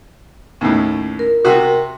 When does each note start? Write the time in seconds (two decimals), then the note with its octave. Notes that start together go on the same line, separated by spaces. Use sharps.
0.61 D#2 A2 C#4
1.19 A#4
1.45 C3 F#4